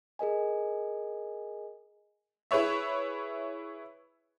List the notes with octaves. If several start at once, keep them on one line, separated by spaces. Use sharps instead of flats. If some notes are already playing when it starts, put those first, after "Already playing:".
G#4 A#4 D#5 G#5
E4 G#4 B4 C#5 E5